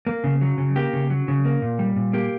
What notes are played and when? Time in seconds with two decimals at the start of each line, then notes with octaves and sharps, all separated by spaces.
0.07 A#3
0.24 C#3
0.41 F#3
0.58 C#3
0.76 A#3 G4
0.93 C#3
1.10 F#3
1.28 C#3
1.45 A#3
1.62 A#2
1.79 G3
1.96 A#2
2.13 A#3 G4